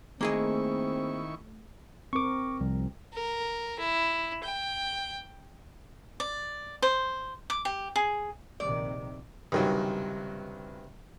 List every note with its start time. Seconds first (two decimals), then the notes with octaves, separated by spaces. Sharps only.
0.21 D#3 A3 A#3 C4 E4 G#4 D#5 C#6
2.13 C4 A#4 C#6 D6
2.60 C2 F3
3.13 A#4
3.79 E4
4.43 G5
6.20 D5
6.82 C5
7.50 D6
7.65 G4
7.96 G#4
8.60 A#1 C3 D#3 D5
9.52 C#2 G2 C3 D#3 F#3